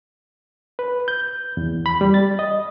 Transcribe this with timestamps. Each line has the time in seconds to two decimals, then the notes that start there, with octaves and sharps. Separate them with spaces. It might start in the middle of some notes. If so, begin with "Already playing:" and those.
0.79 B4
1.08 G6
1.57 E2
1.86 B5
2.01 G3
2.14 A6
2.39 D#5